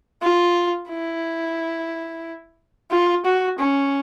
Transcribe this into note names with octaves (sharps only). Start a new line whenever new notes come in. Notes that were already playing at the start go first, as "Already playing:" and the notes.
F4
E4
F4
F#4
C#4